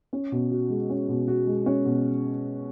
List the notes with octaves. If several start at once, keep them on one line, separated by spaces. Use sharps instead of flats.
C#4
B2
F#4
G#3
C#4
B2
F#4
G#3
C#4
B2